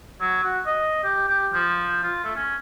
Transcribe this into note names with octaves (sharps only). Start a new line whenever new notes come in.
F#3
F#4
D#5
G4
G4
F3
F4
A3
C#4